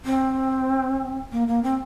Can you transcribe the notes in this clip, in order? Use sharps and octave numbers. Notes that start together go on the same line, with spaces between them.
C4
A#3
A#3
C4